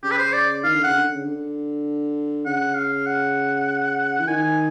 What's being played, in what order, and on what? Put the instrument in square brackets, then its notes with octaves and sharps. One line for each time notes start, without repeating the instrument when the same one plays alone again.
[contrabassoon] C#3 [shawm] G4
[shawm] B4
C5
D5
[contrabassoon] D#3 [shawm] F5
[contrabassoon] D3
[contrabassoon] C#3 [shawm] F#5
[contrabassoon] D3
C#3
D3
[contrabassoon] C#3 [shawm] F#5
[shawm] F5
F#5
[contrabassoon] E3
[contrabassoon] D#3 [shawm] G#5